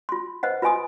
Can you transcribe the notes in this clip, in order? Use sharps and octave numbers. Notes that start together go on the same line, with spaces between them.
F4 C6
B4 C5 D#5 F#5
F4 B4 D#5 G#5 C6 D#6